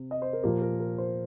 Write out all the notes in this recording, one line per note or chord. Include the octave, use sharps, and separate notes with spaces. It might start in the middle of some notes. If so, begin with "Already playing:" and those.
Already playing: C3
D#5
C5
A#4
A#2 F3 A#3 G4
A#4
A#4
C5